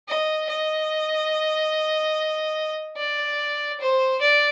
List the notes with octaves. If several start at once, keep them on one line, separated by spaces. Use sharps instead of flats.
D#5
D#5
D5
C5
D5